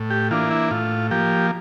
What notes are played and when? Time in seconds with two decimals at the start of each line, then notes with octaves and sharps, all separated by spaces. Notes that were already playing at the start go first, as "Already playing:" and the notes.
Already playing: A2
0.10 G4
0.31 E3 A#3 D4 F4
0.51 E4
0.71 A2 F4
1.11 F3 A#3 G4